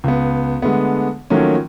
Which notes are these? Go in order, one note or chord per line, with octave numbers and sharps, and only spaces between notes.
C#2 B3
D3 G#3 A3 B3
D#3 F3 F#3 A3 A#3 C#4